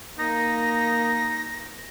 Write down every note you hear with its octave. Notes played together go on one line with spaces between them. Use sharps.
A#3 D#4 A#6